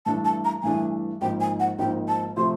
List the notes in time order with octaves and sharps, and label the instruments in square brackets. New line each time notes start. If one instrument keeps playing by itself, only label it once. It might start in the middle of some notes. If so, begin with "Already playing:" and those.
[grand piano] G2 E3 A3 D4 [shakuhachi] A5
[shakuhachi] A5
A#5
[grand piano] G2 E3 A3 D4 [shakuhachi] G#5
[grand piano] G#1 G#2 F3 A#3 D#4 [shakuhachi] G5
[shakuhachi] G#5
F#5
[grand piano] G#1 G#2 F3 A#3 D#4 [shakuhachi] G5
[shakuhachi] A5
[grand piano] C3 F3 A3 [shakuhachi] C6